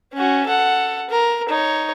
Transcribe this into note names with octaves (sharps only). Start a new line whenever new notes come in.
C#4 F#4
A4 F#5
A#4
D#4 C#5